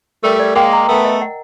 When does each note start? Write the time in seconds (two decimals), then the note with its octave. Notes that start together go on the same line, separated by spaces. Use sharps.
0.23 G3 A3 A#4
0.40 D5
0.56 G#3 A#3 G5
0.73 A#5
0.88 A3 B3 A#4
1.05 D#5
1.21 F#5